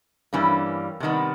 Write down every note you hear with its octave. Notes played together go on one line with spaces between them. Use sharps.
G2 E3 G3 A#3 C#4
C3 D#3 G3 B3